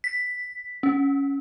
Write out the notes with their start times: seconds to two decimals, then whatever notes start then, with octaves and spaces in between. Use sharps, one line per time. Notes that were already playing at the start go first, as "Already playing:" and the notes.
0.04 B6
0.83 C#4